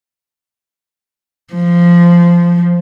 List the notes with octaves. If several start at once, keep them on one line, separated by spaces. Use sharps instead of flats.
F3